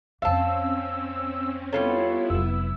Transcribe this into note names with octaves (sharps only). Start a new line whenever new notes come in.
F2 A#3 C4 C#4 F5 A5 E6
G3 B3 E4 F4 A4 C#5
F1 F#3 E6